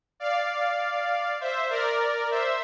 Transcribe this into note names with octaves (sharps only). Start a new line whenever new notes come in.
D5 F5
C5 E5
A#4 D5
C5 E5